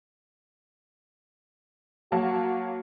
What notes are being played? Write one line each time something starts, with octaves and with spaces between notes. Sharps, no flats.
F#3 A#3 F#4 A5